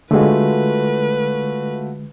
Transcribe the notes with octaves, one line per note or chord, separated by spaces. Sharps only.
D3 G#3 A3 F4 F#4 B4